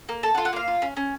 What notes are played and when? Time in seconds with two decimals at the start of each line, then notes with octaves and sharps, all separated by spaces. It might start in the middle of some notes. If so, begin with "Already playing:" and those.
0.09 A#3
0.23 A4 A5
0.35 F#5
0.38 F4
0.45 F#5
0.53 A#3 F5
0.68 F4
0.82 C#4
0.97 C#4